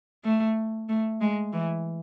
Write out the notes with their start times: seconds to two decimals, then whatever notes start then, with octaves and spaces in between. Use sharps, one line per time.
0.24 A3
0.89 A3
1.21 G#3
1.53 E3